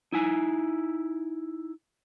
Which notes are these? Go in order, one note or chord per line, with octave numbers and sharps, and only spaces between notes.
D#4 E4 G#5